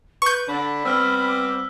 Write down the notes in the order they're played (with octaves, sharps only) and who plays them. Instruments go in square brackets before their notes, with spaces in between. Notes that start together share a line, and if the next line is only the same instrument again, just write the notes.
[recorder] B4 [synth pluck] C#6 G6
[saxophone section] D3 D4 [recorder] B5
[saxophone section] G3 B3 C4 [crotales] E6 F6 B6
[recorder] D6